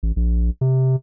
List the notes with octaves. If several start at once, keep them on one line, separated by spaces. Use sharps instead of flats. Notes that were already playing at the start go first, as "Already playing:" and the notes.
A1
A#1
C3